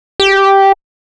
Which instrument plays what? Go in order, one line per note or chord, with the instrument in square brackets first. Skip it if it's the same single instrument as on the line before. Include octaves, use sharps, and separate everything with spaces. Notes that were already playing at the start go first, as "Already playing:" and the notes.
[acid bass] G4